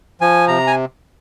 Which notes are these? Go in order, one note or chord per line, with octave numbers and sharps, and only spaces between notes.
F3 G#5
C3 A#5
G#5